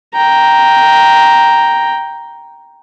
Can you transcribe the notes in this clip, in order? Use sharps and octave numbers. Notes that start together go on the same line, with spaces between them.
G5 A#5